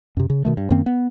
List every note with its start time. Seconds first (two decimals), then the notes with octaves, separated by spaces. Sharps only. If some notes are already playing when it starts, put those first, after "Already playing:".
0.17 F#2 C3
0.30 C#3
0.45 B2 D#3 A3
0.57 G2
0.70 F#2 D#3 A#3 C4
0.86 B3